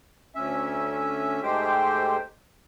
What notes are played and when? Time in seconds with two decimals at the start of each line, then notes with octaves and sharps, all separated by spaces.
0.35 D2 C#4 E5
1.43 G#2 G#3 A3 G4 C5 G5